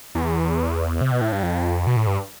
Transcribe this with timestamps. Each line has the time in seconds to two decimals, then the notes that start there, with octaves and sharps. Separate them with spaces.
0.15 E2
1.01 C3
1.12 B2
1.21 A2
1.32 G2
1.43 F2
1.87 B2
1.96 A2
2.07 G2